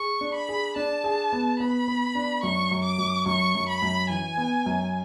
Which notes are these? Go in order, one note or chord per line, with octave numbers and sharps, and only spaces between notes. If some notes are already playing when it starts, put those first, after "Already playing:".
Already playing: G#4 C#6
D4
B5
G#4
D4 A5
G#4
B3
B3 B5
B3
D4
F#2 C#6
F#2
D6
F#2
F#2 C#6
F#2
B5
F#2
E3 G#5
B3
F#2